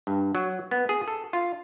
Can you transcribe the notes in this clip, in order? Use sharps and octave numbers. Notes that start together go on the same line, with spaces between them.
G2
F#3
B3
G#4
A4
F4